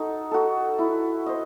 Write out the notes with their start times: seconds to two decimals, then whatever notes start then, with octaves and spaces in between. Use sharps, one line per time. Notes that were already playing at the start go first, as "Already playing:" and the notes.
Already playing: D#4 F#4 A4
0.31 F#4 A4
0.79 E4
1.26 C5 D#5